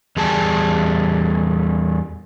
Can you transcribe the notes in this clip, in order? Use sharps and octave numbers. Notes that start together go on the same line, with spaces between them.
E2 G3 G#4 A5